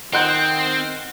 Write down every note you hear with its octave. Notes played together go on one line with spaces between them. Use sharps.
D#3 C4 C5 F#5 C6